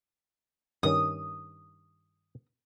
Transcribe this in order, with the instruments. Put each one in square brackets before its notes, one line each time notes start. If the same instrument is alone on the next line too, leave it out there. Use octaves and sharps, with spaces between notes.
[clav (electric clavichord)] G2 D#3 C#4 [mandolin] D#6